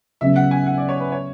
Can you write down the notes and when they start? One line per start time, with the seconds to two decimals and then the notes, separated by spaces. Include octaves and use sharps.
0.21 C#3 F#3 B3 E5
0.36 F#5
0.51 G#5
0.66 F#5
0.78 D5
0.89 C#5
1.00 B4
1.12 C#5